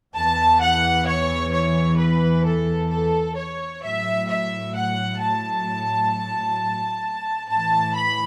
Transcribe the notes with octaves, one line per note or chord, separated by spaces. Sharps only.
E2 E3 A5
F#5
C#5
C#5
B4
A4
A4
C#5
A2 F#3 E5
E5
F#5
A5
A2 E3 A5
B5